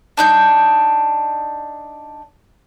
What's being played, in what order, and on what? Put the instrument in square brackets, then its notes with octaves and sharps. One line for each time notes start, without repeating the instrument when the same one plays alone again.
[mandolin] D4 D#4 G6